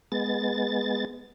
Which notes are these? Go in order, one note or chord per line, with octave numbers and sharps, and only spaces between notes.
G#3 B3 A6